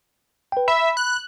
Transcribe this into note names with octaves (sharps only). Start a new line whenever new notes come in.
B4 G5
E5 B5
F#6